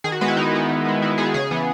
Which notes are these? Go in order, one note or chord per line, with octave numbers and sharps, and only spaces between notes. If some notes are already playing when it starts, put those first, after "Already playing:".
D#3 G#4
F#4
G#3 B3 B4
E4
D#3 D#4
G#3 B3
D#3
G#3 B3
D#3 E4
G#3 B3 G#4
C#3 G#4
E3 B3